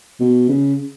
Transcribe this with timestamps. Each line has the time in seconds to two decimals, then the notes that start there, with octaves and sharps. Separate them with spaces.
0.20 B2
0.49 C#3